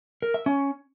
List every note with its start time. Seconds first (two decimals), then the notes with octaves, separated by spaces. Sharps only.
0.22 A#4
0.34 E5
0.46 C#4